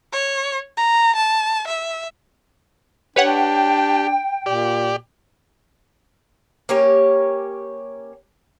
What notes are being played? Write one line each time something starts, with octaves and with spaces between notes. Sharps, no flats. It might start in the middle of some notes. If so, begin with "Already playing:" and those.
C#5
A#5
A5
E5
D4 G4 B4 C#5 F#5 G5
A#2 G4 D5
A#3 C#4 G4 C#5